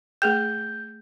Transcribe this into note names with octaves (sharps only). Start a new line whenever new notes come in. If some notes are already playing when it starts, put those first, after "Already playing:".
A3 G#4 G5 G6